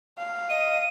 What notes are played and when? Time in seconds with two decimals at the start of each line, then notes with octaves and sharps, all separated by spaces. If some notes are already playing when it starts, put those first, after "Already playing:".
0.18 F5
0.49 D#5 D#7